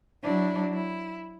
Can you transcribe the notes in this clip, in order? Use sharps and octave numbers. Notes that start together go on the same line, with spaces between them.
F#3 D4 E4
E4